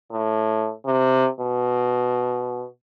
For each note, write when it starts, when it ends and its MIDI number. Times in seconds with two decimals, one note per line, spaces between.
0.11 0.72 45
0.86 1.28 48
1.40 2.66 47